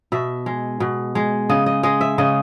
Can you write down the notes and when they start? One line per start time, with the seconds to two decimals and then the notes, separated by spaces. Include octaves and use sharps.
0.12 B2 E5
0.46 G#3
0.80 B2
1.15 G#3
1.49 C#3 D#5
1.66 D#5
1.83 G#3 D#5
2.01 E5
2.18 C#3 D#5